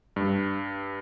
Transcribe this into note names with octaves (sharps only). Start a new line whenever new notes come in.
G2